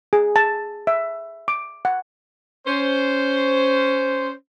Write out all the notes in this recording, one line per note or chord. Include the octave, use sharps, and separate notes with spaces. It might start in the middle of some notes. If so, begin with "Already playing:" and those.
G#4
A5
E5
D6
F#5
C#4 C5